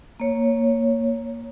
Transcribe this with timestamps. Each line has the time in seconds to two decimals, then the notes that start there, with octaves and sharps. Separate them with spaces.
0.20 A#3 C#5